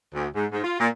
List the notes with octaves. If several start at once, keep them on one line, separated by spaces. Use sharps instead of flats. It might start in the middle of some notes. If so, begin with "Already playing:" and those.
D2
G#2
G#2
F4
A#2